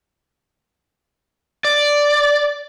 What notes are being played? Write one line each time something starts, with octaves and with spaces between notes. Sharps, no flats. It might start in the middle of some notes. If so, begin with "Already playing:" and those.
D5